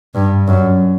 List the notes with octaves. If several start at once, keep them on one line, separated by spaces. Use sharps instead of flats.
G2
F#2